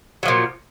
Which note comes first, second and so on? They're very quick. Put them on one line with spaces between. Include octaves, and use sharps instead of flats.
F#3 F3 A#2